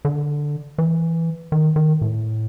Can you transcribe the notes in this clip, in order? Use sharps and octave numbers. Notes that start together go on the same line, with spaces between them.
D3
E3
D#3
D#3
A2